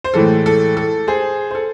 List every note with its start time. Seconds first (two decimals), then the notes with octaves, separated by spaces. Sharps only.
0.04 C5
0.14 A2 E3 G#3 A4
0.46 A4
0.77 A4
1.07 G#4 C5
1.51 C5
1.55 A4